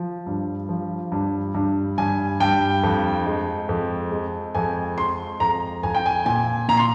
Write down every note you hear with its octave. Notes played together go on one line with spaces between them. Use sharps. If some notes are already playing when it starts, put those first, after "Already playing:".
Already playing: F3
G2
F3
G2
G2
G2 G#5
G2 G5
F2
G#3
F2
G#3
F2 G#5
G#3 C6
F2 A#5
F2 G#5
G5
G#5
A#2 G#5
A#2 A#5
C6